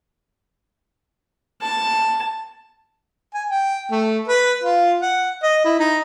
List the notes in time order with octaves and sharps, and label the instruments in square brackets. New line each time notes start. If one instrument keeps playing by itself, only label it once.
[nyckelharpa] A5
[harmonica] G#5
G5
A3
B4
F4
F#5
D#5
E4
D#4